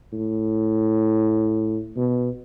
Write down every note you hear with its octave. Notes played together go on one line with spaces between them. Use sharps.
A2
B2